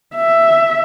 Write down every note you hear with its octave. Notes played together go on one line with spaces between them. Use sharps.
E5